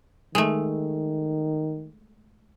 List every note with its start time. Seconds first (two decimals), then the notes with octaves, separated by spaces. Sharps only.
0.35 D#3 G#3 A3